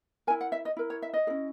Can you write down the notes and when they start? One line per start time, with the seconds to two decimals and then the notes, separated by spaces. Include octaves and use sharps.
0.27 E4 A#4 G#5
0.41 F#5
0.52 E5
0.65 D#5
0.77 E4 A#4
0.90 C#5
1.02 E5
1.14 D#5
1.27 C#4 E4 G#4